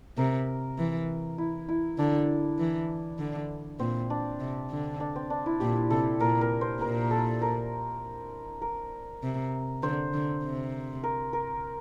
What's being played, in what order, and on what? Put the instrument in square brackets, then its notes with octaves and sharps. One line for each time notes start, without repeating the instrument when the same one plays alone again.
[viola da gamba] C3 [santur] A#4
[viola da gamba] E3
[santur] E4
E4
[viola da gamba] D3 [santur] D4
[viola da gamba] E3
D3
[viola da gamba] A#2 [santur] C4
[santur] D4
[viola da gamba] C3
D3
[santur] D4
C4
D4
E4
[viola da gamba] A#2 [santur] G4
[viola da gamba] C3 [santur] A4
[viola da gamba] A#2 [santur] A#4
[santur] A#4
C5
[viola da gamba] A#2 [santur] A#4
[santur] A4
A#4
A#4
[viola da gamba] C3
[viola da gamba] D3 [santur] C5
[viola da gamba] D3
C3
[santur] A#4
A#4